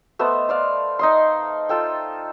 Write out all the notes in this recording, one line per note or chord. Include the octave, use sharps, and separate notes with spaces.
A3 B3 C5 D#5
C5 D5 F5
D#4 D#5 C6
F4 A4 G5